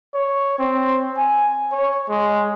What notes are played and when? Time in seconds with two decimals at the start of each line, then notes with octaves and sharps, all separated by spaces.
0.14 C#5
0.59 C4
1.17 G#5
1.72 C#5
2.09 G#3